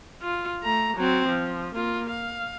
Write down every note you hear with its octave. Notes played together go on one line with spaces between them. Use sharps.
F4
A3 A#5
F#3 C4
F3
A#3 F4
F5